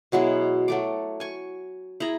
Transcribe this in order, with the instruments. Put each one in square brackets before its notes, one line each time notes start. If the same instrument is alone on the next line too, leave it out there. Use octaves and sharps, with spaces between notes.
[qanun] B2 F#3 G#3 E4
F#3 A3 D6
G#5 C#6
E4 G#4 A#5